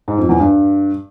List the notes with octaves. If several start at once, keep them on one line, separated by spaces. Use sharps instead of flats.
G#2
F2
E2
G2